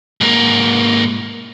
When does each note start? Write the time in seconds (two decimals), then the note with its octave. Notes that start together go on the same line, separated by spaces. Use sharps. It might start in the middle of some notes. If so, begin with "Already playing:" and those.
0.21 G#2 A#3